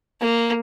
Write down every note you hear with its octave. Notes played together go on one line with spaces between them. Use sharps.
A#3